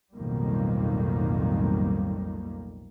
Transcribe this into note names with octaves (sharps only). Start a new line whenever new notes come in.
B1 F2 A2 D#3 G3 A#3